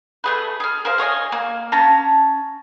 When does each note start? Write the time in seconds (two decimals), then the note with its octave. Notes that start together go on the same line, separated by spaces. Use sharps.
0.24 A3 G#4 B4
0.60 G#4 F6
0.85 A#4 C5 F5
0.98 G#4 C#5 D#5 G#5
1.32 A#3
1.72 C#4 A5 A#5